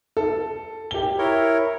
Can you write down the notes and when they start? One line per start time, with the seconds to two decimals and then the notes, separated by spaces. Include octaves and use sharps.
0.17 A4
0.91 G4 G7
1.19 E4 A#4 C#5